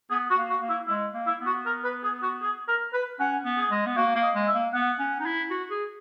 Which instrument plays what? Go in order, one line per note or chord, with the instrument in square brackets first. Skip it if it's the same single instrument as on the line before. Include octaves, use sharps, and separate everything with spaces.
[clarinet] B3 [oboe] G#4
[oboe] F#4
[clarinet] A#3
[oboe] F#4
[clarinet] A#3
[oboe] E4
[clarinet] G#3 [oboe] E4
[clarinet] A#3
[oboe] E4
[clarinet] B3
[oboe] F#4
A#4
B4
G#4
F#4
G#4
A#4
B4
[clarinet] C#4 [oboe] F#5
[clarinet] B3
[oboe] G#4
[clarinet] G#3
B3
[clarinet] A#3 [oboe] F#4
[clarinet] A#3
[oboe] D#5
[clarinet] G#3
[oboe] E5
[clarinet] A#3
[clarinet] B3 [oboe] F#5
[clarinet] C#4
D#4
E4
F#4
G#4